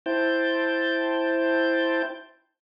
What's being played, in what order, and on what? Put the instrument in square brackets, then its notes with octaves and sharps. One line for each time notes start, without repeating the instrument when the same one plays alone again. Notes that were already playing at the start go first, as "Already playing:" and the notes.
[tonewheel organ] E4 C5 G5 A5 G6